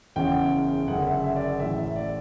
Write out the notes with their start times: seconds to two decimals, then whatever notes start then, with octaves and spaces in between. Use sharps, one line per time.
0.16 F#1 E2 C#3 E3 G5
0.88 F#1 F#2 D3 F#5
1.06 E5
1.24 E5
1.36 D5
1.48 E5
1.60 A1 A2 E3 E5
1.78 E5
1.96 D5